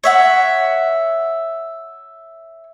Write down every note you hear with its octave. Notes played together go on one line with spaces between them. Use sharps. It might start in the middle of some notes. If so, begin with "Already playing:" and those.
C#5 E5 F#5